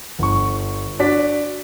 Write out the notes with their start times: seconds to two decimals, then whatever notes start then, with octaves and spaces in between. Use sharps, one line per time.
0.19 G1 C#6
0.99 D4 F#4 D5 B6